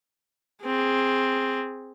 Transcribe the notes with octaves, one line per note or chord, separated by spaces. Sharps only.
C4 G#4